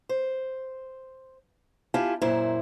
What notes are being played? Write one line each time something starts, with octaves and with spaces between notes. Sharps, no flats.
C5
E4 F4 G4 G#5 A5
F#2 A#2 E4 C5